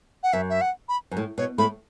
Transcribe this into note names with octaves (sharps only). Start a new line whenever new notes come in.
F#5
F#2 E5
E5
F#5
B5
F#2
A2
B2 C#5
A2 A3 B5